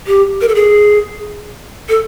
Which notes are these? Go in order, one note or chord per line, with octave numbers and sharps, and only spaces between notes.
G4
A#4
A4
G#4
A4